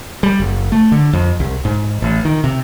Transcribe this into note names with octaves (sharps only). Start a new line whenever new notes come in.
G3
F#1
A3
D3
F2
C2
G#2
A1
D#3
C3